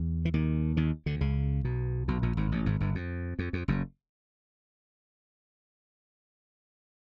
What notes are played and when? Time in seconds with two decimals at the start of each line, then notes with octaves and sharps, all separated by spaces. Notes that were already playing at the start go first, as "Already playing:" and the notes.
Already playing: E2
0.25 E3
0.34 D#2 D#3
0.77 D#2 D#3
1.06 D2 D3
1.21 C#2 C#3
1.65 B1 B2
2.08 B1 B2
2.22 A#1 A#2
2.37 G#1 G#2
2.52 A1 A2
2.66 G#1 G#2
2.80 G1 G2
2.95 F2
3.39 F2
3.53 F2
3.68 F#1 F#2